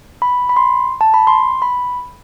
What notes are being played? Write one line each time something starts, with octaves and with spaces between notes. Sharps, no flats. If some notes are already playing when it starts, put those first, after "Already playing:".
B5
B5
C6
A5
B5
C6
B5